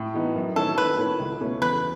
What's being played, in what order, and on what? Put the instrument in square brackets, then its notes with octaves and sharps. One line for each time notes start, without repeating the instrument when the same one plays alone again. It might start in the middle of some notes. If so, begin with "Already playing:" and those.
Already playing: [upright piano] A2
E3 B3 D#4
F#2
[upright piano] D#3 A3 C#4 E4 [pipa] A4
[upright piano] D#2 [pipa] B4
[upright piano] D#3 A3 C#4 E4
C#2
B2 A3 C#4 E4
[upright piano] E2 [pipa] B4